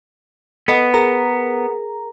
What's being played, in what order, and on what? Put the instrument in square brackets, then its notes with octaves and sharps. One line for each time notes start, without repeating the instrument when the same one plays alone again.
[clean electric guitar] B3 [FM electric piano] A4 D#5
[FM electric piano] G#4 A#4 A#5